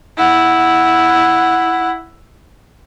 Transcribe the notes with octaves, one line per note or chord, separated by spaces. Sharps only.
E4 F#5